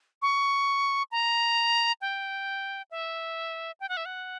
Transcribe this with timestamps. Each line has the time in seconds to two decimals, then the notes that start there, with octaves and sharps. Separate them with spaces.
0.22 C#6
1.12 A#5
2.01 G5
2.91 E5
3.80 G5
3.89 F#5
3.97 E5
4.05 F#5